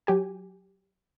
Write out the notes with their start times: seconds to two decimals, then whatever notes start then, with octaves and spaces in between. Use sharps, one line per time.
0.07 F#3 G4 G#5